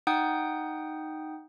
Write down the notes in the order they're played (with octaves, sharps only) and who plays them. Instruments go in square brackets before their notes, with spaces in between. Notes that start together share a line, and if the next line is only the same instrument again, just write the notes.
[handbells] D#4 F#5 G5 D#6 G6